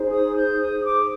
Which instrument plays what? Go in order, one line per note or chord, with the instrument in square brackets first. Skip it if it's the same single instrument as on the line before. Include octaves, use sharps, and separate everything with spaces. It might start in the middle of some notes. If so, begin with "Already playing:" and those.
Already playing: [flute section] D#4 G#4 C5
D#6
G6
D#6
D6